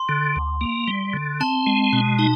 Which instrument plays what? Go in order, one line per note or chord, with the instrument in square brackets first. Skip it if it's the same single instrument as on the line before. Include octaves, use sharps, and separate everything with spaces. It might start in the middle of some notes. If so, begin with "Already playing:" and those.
Already playing: [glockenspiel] C6
[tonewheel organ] D3
D2
A#3
G3
D3
[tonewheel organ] C4 [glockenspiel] A5
[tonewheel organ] G#3
B2
[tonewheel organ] D#4 [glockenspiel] A5